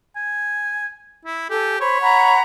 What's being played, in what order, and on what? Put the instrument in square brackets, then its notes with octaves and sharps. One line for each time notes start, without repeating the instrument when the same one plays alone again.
[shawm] G#5
E4
[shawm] G4 [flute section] A4 G#5
[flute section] C5 B5 [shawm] C#5
[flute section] F#5 A#5 B5